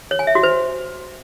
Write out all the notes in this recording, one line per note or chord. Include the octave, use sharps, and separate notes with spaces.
C#5
G#5
E5
F#4
C5